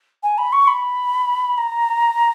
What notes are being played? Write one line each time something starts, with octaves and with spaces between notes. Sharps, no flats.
G#5
B5
C#6
B5
A#5